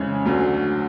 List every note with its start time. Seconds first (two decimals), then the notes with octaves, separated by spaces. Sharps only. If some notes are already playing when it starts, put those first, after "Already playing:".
Already playing: F2 C#3 E3 G#3 C#4 C#5
0.26 D2 D3 F#3